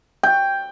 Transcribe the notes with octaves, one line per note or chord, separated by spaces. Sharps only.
G5